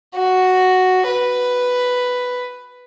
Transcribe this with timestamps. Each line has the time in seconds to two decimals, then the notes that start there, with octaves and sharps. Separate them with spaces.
0.16 F#4
1.08 B4